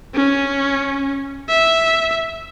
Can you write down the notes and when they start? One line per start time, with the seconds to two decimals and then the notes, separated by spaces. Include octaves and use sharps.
0.14 C#4
1.49 E5